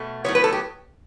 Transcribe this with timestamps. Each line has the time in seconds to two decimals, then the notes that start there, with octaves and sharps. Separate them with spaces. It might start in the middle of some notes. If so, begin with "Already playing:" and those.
Already playing: B2 A3
0.24 A2 F#3 B3 C#5
0.35 B4
0.44 A4
0.53 G4